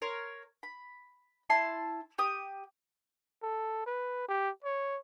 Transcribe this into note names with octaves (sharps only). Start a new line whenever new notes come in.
A#4 C#5 C6
B5
E4 A5 C6
G4 D#6
A4
B4
G4
C#5